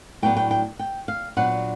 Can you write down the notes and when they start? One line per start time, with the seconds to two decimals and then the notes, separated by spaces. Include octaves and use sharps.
0.22 A2 F#3 B3 D4 G5
0.37 G5
0.51 G5
0.79 G5
1.08 F5
1.37 A#2 F#3 B3 D4 F#5